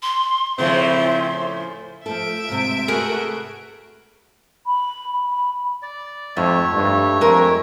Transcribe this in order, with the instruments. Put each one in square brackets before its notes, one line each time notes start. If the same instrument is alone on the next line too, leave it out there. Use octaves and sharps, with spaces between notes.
[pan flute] C6
[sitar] A2 C#3 F3 [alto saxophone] C4 [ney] E5 [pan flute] C6
[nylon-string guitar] F3 A3 A4 [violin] E5 D7
[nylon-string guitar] D2 G#2 C3
[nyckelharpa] A3 F#4 [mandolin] G#4 A#4 B4
[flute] B5
B5
[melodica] D5
[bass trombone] F2 [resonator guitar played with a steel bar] G#2 [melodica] A3 C#5 E5
[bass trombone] G2
[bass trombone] F2 [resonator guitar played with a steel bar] G#3 A#4